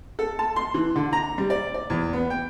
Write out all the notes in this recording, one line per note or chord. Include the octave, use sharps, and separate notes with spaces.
A4
A5
C6
E3
D3
A#5
G3
D5
D5
E2
B3
G5